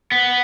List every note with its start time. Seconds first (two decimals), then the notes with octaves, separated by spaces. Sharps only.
0.12 B3